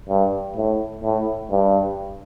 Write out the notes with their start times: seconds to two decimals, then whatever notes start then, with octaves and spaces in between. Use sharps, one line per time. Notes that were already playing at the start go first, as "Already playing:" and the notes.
0.09 G2
0.57 A2
1.04 A2
1.51 G2